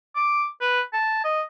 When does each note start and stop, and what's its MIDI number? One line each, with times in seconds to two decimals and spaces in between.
0.16 0.46 86
0.61 0.81 71
0.93 1.19 81
1.24 1.42 75